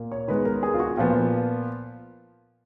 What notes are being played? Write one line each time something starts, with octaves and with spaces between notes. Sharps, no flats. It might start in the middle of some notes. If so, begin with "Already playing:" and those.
Already playing: A#2 A#3
C#5
D#3 G#3 B3 B4
A#4
G#4
F4
F#4
A#2 F3 B3